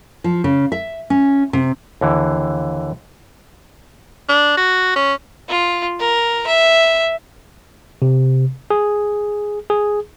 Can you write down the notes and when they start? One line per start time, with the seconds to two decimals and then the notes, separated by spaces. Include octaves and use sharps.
0.24 F3
0.44 C#3
0.72 E5
1.10 C#4
1.53 C3
2.01 D#2 D3 E3
4.29 D4
4.57 F#4
4.96 C#4
5.49 F4
6.00 A#4
6.47 E5
8.02 C3
8.70 G#4
9.70 G#4